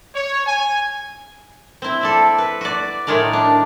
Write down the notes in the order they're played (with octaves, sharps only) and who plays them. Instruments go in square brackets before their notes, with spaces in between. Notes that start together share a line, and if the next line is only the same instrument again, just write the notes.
[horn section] C#5
G#5
[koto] C4 E4
A4 D5 E5
B4
F#4 D5
A2 D#3 G#3 A#4 D5
D4